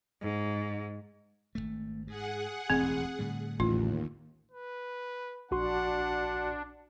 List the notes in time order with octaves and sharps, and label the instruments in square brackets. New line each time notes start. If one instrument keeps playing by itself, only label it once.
[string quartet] G#2
[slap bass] G#1 D#2 A3
[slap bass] G#2 [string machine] G#4 F#5
[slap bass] E1 A1 D#2 [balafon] C4
[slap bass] A2 D3 G3
[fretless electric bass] A1 [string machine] D#2 [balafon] F4
[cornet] B4
[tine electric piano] A#1 F#4 C6 [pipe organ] D4 [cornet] F#5